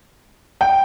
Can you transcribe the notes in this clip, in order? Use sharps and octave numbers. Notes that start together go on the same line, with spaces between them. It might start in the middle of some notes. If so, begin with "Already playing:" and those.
G5